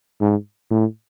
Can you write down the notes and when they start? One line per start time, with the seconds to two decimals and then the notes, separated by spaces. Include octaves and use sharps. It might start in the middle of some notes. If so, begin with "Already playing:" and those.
0.21 G#2
0.71 A2